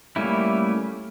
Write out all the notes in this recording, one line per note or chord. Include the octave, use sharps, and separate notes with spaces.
G3 A3 A#3 C#4 E4